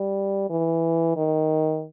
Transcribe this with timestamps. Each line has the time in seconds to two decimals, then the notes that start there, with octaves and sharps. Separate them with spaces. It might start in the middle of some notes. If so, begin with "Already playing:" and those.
Already playing: G3
0.50 E3
1.16 D#3